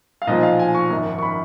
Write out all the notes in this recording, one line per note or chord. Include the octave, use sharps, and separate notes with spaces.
F5
B1 A#2 F3 D#5
F5
G#5
C#6
G#1 F#2 F3
C#6
B5